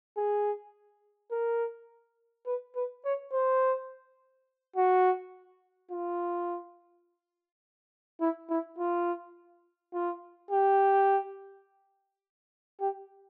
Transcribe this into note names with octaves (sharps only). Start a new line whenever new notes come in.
G#4
A#4
B4
B4
C#5
C5
F#4
F4
E4
E4
F4
F4
G4
G4